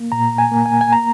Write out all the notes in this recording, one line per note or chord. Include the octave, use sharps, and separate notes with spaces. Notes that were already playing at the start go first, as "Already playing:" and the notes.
Already playing: A#3
A#2 A#5
G#5
A#3
G#5
G#5
A#5